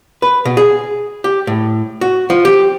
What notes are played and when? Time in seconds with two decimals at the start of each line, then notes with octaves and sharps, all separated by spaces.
0.22 B4
0.45 B2
0.57 G#4
1.24 G4
1.47 A2
2.01 F#4
2.30 F3
2.45 G4